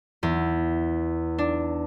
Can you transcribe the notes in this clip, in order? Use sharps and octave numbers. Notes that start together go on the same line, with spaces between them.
E2
D4